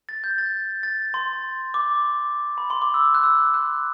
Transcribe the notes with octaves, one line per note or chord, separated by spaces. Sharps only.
A6
G6
A6
A6
C6
D6
B5
C6
D6
E6
F#6
E6
F#6